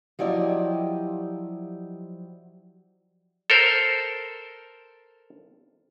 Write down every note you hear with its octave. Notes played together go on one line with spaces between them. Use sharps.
F3 F#3 E4 G4 D5 D#5
A4 A#4 C5